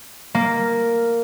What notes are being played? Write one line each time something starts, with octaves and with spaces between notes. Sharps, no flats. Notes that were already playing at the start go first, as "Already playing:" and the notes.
A#3